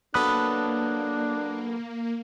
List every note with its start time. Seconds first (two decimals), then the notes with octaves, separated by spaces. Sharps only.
0.14 F#3 A#3 B3 D4 A4 B5 D#6 F#6